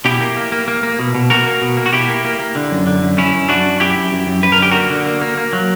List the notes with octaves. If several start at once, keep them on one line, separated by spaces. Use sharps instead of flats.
B2 E4 G4
A#3
A#3
A#3
A#3
A#3
B2
B2
A#3 F#4 A#4
A#3
B2
A#3
F#4
B2 E4 G4
A#3
A#3
A#3
D3
F#2
D3
F#2
F#2 C#4 E4
F#2
F#2 D4 F#4
F#2
F#2 E4 G4
F#2
F#2
F#2
F#2 B4
A#4
D3 G4
A#3 F#4 A#4
D3
A#3
A#3
A#3
F#3